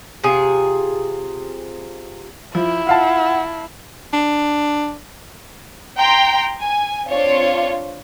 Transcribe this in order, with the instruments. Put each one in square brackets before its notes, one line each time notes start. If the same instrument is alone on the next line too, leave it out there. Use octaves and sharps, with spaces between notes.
[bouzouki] C3 F4 G#4
[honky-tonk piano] F3 [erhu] E4
[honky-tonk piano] F4 F5 A5 [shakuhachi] F#5
[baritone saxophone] D4
[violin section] G5 A#5 C6
G#5
C4 D4 F4 C#5